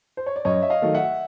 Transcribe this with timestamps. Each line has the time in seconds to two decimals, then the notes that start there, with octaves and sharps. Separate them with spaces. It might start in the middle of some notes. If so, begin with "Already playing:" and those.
0.17 C5
0.26 C#5
0.36 D5
0.45 F#2 C#5 D#5
0.62 E5
0.70 D#5 F5
0.82 D#3 F#3 A3
0.94 E5 F#5